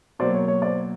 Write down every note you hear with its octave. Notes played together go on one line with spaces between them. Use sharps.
B2 F#3 A#3 C5 D5
C#5
C#5
C5 D5